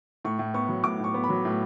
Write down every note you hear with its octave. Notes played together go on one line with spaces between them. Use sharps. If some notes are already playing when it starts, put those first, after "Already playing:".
A2 C#6
A2
B3 C#6
F#3
A2 D6
A2 C#6
B3
B5
F#3
A2